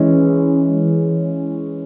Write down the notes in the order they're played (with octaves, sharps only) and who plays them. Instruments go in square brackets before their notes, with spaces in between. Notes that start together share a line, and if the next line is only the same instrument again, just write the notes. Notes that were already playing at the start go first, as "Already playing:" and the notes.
Already playing: [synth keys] E3 G#3 C#4